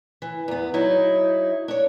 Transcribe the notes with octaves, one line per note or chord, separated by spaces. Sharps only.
E3
E2 B3
F#3 D#4 E4
D4 C#5